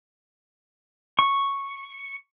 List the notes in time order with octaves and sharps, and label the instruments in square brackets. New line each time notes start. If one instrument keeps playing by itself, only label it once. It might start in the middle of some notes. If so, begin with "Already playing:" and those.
[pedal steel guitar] C#6